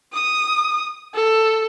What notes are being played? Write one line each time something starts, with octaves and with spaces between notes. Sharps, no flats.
D#6
A4